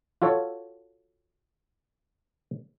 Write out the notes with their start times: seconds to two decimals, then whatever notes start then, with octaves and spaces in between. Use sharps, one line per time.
0.22 F4 F#4 A4 C#5